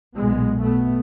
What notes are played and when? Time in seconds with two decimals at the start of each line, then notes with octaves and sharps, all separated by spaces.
0.17 B1 A#2 G#3 B3
0.61 B2 A3 B3